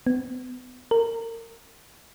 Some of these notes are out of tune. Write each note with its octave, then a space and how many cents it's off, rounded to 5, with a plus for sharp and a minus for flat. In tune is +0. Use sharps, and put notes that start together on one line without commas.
B3 +30
A#4 -25